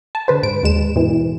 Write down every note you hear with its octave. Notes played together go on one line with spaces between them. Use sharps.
A5
D3 B4 C5
G#2 D7
D#2 G#3 E7
G#2 B2 E3